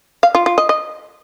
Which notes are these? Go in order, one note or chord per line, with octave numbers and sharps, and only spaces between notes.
F5
F4
F4
D#5
D#5